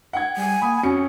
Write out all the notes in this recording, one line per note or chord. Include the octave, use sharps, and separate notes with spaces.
F#5 G5 G#6
G3 G#5
A#3 B5 D#6
F2 C#4 F#4 C#7